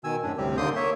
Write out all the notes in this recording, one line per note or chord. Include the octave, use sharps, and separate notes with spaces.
B2 D#3 G#5 E6
F#2 A2 D4
D2 A2 C3 G3 C4 G4
D#2 D3 A#3 C6 D#6 G6
A#3 C#5 E5